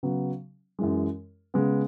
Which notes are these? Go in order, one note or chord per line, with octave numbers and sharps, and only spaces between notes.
C#3 F#3 B3
F#2 E3 G#3
C#3 G#3 B3